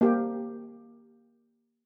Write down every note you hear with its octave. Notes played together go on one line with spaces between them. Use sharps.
A#3 G4